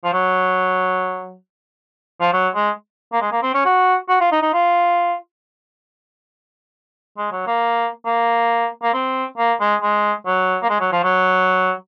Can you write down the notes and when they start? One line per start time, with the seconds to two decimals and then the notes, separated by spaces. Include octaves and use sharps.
0.04 F3
0.13 F#3
2.20 F3
2.33 F#3
2.55 G#3
3.13 A#3
3.21 G#3
3.32 A#3
3.43 C4
3.54 C#4
3.65 F#4
4.09 F#4
4.21 F4
4.32 D#4
4.42 D#4
4.54 F4
7.18 G#3
7.32 F#3
7.47 A#3
8.05 A#3
8.83 A#3
8.94 C4
9.38 A#3
9.60 G#3
9.82 G#3
10.26 F#3
10.62 A#3
10.69 G#3
10.80 F#3
10.92 F3
11.03 F#3